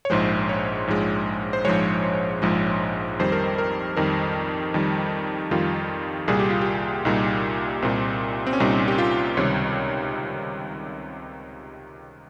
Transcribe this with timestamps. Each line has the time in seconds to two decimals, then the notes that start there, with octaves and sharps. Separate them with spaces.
0.05 C#5
0.10 A#1 G#2 F3 G#3 C5
0.49 C#5
0.87 A#1 G#2 F3 G#3
1.53 C5
1.65 A#1 G#2 F3 G#3 C#5
2.42 A#1 G#2 F3 G#3
3.19 F2 D#3 G3 C5
3.32 A#4
3.44 C5
3.58 A#4
3.97 F2 D#3 G3 A#4
4.74 F2 D#3 G3
5.51 F2 D#3 G3 F4
6.28 C2 A#2 G3 G#4
6.40 G4
6.50 F4
6.62 G4
7.05 C2 A#2 G3 D#4
7.82 C2 A#2 G3 C4
8.47 C4
8.53 C#4
8.60 C2 A#2 G3 D#4
8.88 G4
8.98 F4
9.37 C#2 C3 D#3 G3 C#5